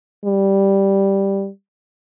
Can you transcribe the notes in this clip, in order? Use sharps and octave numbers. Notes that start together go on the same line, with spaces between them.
G3